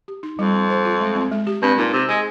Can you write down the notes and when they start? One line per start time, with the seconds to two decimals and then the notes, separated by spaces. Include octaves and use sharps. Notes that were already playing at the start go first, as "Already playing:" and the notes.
0.08 G4
0.23 D#4
0.39 F2 G3
0.54 C4
0.70 C5
0.85 F4
1.01 G#3
1.16 C4
1.31 G#3
1.47 G4
1.62 G2 C4
1.78 A#2 D#4
1.93 C3 C5
2.09 G#3 G#4